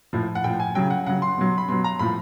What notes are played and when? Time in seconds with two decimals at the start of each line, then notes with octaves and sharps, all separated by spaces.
0.13 A2 F3
0.35 F#5
0.44 A2 F3 G5
0.60 G#5
0.75 C#3 F#3 G5
0.90 F#5
1.06 C#3 F#3 F#5
1.22 C6
1.37 B2 F#3
1.58 B5
1.69 B2 F#3 C6
1.84 A#5
1.99 A2 F3 B5